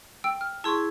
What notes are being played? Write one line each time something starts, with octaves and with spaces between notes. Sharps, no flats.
G5 E6 D7
F6
E4 G#4 A5 C6 C#6